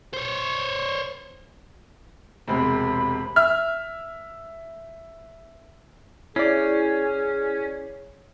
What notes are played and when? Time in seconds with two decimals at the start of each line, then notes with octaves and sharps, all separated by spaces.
0.14 C5 C#5
2.48 E1 C3 G#3 B5
3.36 E5 F6
6.36 C#4 E4 G#4 C#5 D5 C7